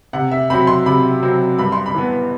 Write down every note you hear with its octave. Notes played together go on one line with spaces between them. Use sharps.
C3 F#5
E5
F#3 C4 B5
C6
C3 B5
F#3 C4
G2 B5
C6
B5
E3 B3